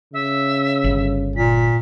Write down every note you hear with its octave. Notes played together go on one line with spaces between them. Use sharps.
C#3 E5
G1
A#2 B6